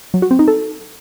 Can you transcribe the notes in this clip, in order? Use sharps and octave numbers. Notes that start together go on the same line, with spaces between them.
F#3
F#4
C4
D#4
A4